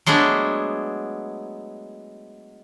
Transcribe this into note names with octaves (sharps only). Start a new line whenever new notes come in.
F#3 G#3 A3 B3 D4